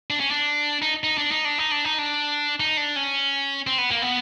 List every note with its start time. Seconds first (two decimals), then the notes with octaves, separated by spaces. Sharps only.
0.10 D4
0.20 C#4
0.31 D4
0.82 D#4
1.04 D#4
1.18 D4
1.31 D#4
1.45 D4
1.58 D#4
1.72 D4
1.85 D#4
1.99 D4
2.60 D#4
2.77 D4
2.96 C#4
3.67 C4
3.78 B3
3.91 A#3
4.02 B3